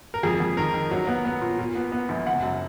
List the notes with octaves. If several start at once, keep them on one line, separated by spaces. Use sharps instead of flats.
A#4
F2 G#4
F2
D#3 A#4
D#3
F#3
B3
B3
A#2
A#2
B3
B3
A#1
F#1 F#5
F#2